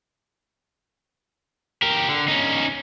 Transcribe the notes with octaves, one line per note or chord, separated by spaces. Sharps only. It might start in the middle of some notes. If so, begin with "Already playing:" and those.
G4 A#4
D3
C#4 D#4